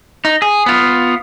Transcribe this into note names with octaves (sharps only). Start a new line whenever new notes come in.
D#4
G#4
B3 F4